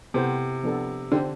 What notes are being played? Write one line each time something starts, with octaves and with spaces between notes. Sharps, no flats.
C3 B3 E4 A4 C5
F3 B3 D4 A4
D3 C4 G4 C5